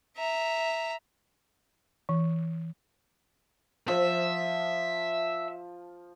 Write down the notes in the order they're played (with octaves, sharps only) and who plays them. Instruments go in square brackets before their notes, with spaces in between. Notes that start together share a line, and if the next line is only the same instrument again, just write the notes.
[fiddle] E5 A#5
[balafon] E3
[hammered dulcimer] F3 [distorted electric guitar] E5